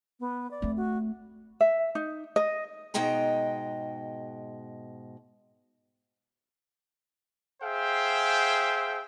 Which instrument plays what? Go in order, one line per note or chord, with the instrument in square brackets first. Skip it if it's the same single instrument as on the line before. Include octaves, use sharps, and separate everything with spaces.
[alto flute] B3
D5
[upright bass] A3 C4
[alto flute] F#4
[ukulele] E5
D#4
D#5
[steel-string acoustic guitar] G#2 B2 G#3 D#5 G5 A#5
[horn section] G#4 C5 E5 F5 G5